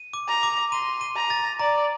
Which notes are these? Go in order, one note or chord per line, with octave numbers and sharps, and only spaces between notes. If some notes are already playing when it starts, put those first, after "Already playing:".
Already playing: D#7
D6
A#5
D6
C6 D#7
D#7
A#5
A6
D5 A#5